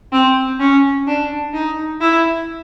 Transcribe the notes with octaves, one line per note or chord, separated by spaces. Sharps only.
C4
C#4
D4
D#4
E4